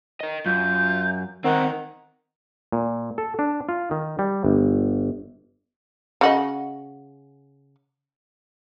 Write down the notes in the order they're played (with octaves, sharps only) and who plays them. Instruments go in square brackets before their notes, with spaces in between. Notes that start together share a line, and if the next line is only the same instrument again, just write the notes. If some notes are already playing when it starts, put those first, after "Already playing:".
[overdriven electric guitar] A#4 D#5
[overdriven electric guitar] F#2 [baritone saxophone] F4 [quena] G6
[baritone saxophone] D#3 [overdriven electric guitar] C4 A#4 [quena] F#5
[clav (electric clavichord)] A#2
A4
D4
F4
D#3
G3
G1
[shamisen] C#3 F#4 D#5